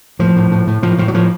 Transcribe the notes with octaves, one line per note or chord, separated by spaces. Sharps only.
A2 F3
A2
A2
A2
A2 F3
A2 F3
F#3
A2 F3